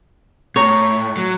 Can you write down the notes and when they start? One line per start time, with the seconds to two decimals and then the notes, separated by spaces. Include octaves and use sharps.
0.56 A2 C#5 A#5
1.17 F#3